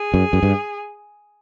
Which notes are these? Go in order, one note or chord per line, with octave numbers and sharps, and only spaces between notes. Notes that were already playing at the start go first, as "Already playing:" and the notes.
Already playing: G#4
F#2
F#2
G2